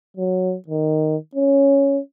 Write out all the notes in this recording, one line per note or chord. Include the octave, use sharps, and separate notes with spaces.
F#3
D#3
C#4